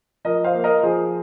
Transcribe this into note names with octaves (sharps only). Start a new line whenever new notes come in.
F3 A#4 D#5
C5 F5
A#3
A#4 D#5
F3 G#4 C5